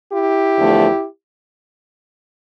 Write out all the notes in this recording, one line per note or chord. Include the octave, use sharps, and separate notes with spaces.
E4 G4
E2 D3 F3 A3